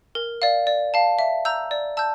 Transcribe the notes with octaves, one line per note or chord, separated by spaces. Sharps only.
A#4
D5 F5
D5
F5 A5
E5
A#5 E6 G6
D5
A5 E6 G6